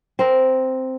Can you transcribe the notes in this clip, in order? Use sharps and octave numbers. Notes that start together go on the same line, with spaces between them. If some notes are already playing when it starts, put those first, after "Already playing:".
C4 A#4